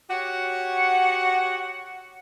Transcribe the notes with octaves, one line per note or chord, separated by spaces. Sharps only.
F#4 G4 C#5 F#5